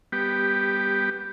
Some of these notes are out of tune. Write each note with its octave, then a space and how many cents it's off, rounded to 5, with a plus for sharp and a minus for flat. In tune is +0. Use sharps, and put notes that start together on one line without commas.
G3 +20 B3 +0 G4 +0